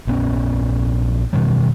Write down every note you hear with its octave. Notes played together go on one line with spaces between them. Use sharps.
A#1 B3 C#4
B2 D#3 G3